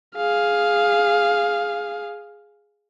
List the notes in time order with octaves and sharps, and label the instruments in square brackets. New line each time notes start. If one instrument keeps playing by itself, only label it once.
[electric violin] G#4 F5